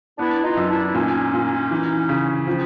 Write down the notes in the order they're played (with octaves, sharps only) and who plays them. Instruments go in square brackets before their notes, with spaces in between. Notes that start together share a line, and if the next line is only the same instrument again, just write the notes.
[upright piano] B3 [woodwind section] D4 E4
[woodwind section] D#4 F4
[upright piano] F#2
[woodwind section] D4 E4
E4
[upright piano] A#2 [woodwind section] C#4 D#4
[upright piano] A#2
E3
C#3
[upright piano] F3 [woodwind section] C4 D4